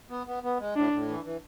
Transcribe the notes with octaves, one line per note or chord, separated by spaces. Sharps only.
B3
B3
B3
G#3
A2 D4
A2
E3
E3